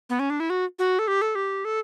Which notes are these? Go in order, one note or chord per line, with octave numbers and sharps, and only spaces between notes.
B3
C#4
D4
E4
F#4
F#4
A4
G4
A4
G4
A4